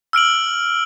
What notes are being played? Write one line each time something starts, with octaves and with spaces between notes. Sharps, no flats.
E6 F6 D7 F#7